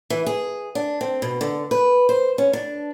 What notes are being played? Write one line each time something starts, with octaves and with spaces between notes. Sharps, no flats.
E3
G#4
D4
C4
B2
D3
B4
C5
C#4
D4